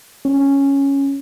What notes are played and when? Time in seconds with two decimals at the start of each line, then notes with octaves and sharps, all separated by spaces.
0.25 C#4